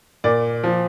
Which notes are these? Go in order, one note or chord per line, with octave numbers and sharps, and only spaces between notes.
A#2 D5
F3